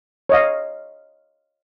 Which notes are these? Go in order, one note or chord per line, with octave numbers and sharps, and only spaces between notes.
C#5 D#5 F5